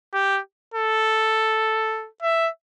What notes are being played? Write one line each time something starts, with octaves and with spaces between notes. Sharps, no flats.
G4
A4
E5